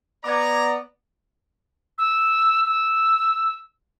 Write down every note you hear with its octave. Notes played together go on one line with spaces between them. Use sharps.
B3 D5 A#5 D6 G#6
E6
E6